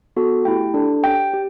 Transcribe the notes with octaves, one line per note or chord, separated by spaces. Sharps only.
B3 F#4 A4
A3 E4 G4 G5
D4 A4
C#4 G4 G5
G4